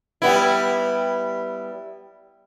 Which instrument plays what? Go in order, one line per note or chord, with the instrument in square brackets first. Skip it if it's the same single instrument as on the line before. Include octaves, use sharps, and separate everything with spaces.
[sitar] G3 B3 E4